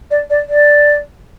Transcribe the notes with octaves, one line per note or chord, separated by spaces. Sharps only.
D5
D5
D5